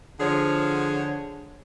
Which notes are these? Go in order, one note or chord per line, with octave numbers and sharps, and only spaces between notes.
D3 F3 G#4 C#5